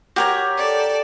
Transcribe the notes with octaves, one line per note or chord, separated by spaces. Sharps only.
F#4 G4 A#4 C#5
A4 D5